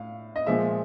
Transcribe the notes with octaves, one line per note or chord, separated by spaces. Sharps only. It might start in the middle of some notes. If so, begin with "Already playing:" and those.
Already playing: A2 F5
D#5
A#2 F3 G#3 E5